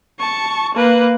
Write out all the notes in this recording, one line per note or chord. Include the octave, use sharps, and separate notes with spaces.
A5 C#6
A#3 B4